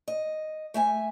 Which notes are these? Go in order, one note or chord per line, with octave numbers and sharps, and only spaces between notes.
D#5
A3 E5 G#5